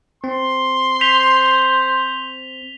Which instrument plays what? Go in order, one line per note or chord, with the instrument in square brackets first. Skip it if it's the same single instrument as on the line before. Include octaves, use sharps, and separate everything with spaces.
[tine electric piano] C4 [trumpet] C6
[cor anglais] C5 [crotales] B6 F7 G7